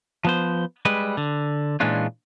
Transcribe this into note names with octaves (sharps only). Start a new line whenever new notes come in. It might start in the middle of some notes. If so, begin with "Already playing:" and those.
F3 B3 C5
G3 G#3 B4
D3
A#2 E3 G#3 C#4 D4 F4